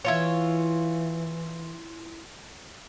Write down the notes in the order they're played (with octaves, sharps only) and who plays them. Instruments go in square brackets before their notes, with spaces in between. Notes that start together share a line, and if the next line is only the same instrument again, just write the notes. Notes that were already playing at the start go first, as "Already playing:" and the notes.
[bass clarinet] E3 [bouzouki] E4 F4 C#5